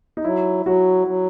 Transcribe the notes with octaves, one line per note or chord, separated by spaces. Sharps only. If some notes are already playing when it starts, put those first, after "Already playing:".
D#4
F#3 E4
F#3 F#4
F#3